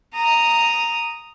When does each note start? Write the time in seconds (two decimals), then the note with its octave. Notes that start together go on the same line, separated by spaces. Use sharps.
0.14 A#5 D#6